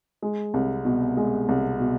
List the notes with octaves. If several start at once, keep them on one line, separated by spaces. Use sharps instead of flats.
G#3
C2
B2
G#3
C2
B2